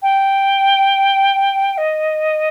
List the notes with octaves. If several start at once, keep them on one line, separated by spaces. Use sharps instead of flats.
G5
D#5